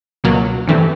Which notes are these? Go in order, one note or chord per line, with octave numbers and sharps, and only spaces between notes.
C#2 B2 F#3 A#3
G2 E3 A3 C4